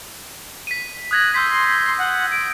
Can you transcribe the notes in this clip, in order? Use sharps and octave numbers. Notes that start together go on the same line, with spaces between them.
B6 D#7
D#6 F#6 G#6 A#6
C6 E6 G6 B6
F#5
D7